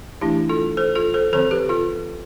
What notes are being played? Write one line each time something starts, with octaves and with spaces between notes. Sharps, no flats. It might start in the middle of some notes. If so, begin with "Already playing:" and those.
E3 A3 D4 E4 G4
F4 A4
A4 C5
F4 A4
A4 C5
D3 F3 C4 A4 C5
G4 B4
F4 A4